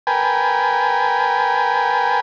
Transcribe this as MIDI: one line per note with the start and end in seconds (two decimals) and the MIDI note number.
0.07 2.20 70
0.07 2.20 71
0.07 2.20 79
0.07 2.20 80